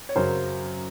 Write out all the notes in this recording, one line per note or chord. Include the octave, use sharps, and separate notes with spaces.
C#5
F#2 C#3 F#3 A#4 C5